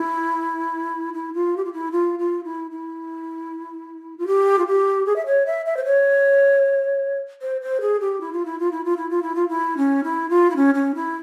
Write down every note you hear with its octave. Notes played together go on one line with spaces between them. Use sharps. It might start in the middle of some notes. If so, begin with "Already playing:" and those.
Already playing: E4
E4
F4
G4
F4
E4
F4
F4
E4
E4
F4
G4
F4
G4
G#4
E5
C#5
E5
E5
C5
C#5
C5
C5
G#4
G4
E4
F4
E4
F4
E4
F4
E4
F4
E4
F4
E4
C#4
E4
F4
E4
C#4
C#4
E4